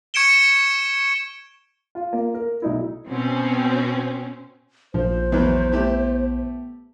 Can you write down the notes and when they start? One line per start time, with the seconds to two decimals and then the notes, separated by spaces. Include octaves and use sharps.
0.14 C#6 G#6 C#7 D7 E7 G7
1.95 F4
2.13 A#3
2.34 A#4
2.62 B1 D#4 E4
3.09 B2 C4 C#4
4.94 A#1 F3 C5
5.32 E2 E3 F#3 B3
5.72 A3 E4 G4